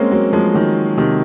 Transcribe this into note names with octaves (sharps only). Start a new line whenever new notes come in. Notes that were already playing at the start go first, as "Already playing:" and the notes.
Already playing: G#3 A#3 C4 C#4
F#3 A#3
F3 G#3
D#3 F#3
C3 D#3